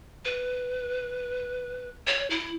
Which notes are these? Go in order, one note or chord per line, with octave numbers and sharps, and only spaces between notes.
B4
C#5
E4